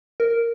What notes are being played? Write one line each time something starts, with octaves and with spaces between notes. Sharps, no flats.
A#4